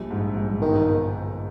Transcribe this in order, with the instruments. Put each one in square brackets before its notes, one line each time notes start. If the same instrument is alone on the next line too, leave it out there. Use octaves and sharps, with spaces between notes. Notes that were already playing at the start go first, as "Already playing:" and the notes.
Already playing: [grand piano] A#1 G3
G#2
A#1
[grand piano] G1 [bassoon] D#3